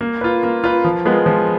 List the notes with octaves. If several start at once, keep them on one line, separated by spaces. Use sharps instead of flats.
A#3
F4 B4
A#3
F4 B4
F3
G#3 B3 F4 A#4
F3